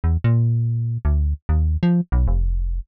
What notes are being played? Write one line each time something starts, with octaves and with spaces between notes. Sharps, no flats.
E2
A#2
D2
D#2
F3
B1
F1